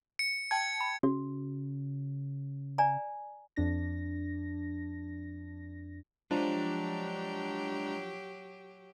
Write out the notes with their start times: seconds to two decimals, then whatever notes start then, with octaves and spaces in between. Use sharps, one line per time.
0.19 C#7
0.51 G5 A5 G#6
0.81 B5
1.03 C#3 F#4
2.78 D5 G#5 A#5
3.56 F2 D4 A#6
6.31 F3 F#3 G#3 D4 G4 A#5